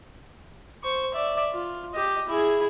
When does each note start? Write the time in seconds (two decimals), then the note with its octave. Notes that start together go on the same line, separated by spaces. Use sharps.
0.83 C5 C#6
1.14 D5 E5
1.53 F4
1.94 G4 D#5
2.29 E4 G#4